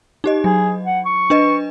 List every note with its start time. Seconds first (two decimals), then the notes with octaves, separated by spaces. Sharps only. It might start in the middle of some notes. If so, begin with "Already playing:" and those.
0.24 D#4 G4 D#5
0.44 F#3 G#4
0.85 F#5
1.06 C#6
1.30 D4 B4 D#5